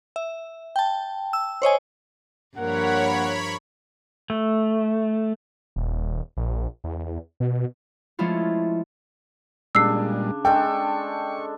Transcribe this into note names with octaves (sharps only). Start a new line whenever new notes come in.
E5
G5 A5
E6
C5 C#5 D#5 G#5
G2 F3 A#3 A#4 C#5 F#5 B5
A3
D#1
A#1
E2
B2
F3 G#3 A3 C#4 E4 F4
A#2 C#3 G3 G#3 D4 E6 C7
G#3 D4 A4 G5 C#6